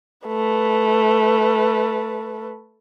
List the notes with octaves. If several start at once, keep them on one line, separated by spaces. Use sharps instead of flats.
A3 B4